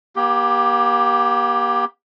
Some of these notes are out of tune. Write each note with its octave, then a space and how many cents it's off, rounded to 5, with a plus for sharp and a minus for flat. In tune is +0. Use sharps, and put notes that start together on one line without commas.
A#3 +40 G4 +0